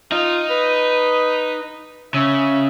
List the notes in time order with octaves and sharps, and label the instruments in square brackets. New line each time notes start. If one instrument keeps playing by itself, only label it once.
[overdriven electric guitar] D#4 [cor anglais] F4
[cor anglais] B4
[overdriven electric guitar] C#3 [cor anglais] E5